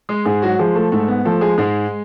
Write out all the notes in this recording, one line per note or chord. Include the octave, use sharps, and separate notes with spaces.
G#3 G#4
G#2 G#3 G#4
F#3 F#4
F3 G#3 G#4
A3 A4
G#2 A3 A4
B3
F3 A3 A4
G#3 G#4
G#2 G#3 G#4